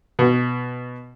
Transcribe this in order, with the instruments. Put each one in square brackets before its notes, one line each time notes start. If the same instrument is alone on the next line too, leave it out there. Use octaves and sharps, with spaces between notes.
[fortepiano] B2